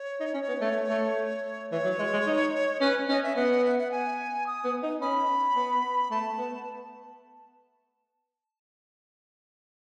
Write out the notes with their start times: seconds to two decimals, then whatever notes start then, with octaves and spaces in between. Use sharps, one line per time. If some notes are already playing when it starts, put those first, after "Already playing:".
Already playing: C#5
0.20 D#4
0.34 C#4
0.48 B3
0.61 A3
0.90 A3
1.71 E3 C#5
1.85 F#3
1.99 G#3
2.13 G#3
2.26 D#4
2.81 C#4 B4
3.09 C#4 D#5
3.23 E5
3.36 B3 F#5
3.65 E5
3.79 F#5
3.91 G#5
4.47 D#6
4.64 B3
4.83 D#4
5.01 C#4 B5
5.56 B3
6.11 A3 A5
6.38 B3